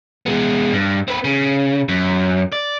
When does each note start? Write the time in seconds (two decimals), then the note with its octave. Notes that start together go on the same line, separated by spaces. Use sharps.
0.26 G#3 B3
0.73 G2
1.08 C4 B4
1.24 C#3
1.89 F#2
2.52 D5